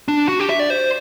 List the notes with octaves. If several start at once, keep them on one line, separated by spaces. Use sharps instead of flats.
D4
F#4
G4
E5
D5
C5